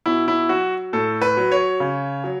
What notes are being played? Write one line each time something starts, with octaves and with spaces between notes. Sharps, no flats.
B2 E4
E4
F#3 F#4
A2 A4
B4
F#3
C#5
C#3
F#3